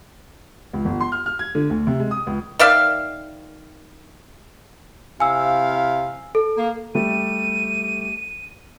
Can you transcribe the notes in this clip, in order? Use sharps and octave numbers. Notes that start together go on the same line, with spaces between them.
C#2
G1
C6
F6
F6
G#6
D3
D2
C3
G#3
D#6
C#2
D#3 D5 E5 F5
C3 E4 F5 G#5 E6
A4
A#3
G3 A3 G4 D#7